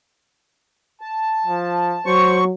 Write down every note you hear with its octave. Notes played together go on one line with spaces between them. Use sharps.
A5
F3
F#3 C5 C#6